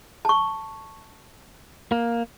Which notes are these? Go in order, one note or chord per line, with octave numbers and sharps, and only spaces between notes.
A5 C#6
A#3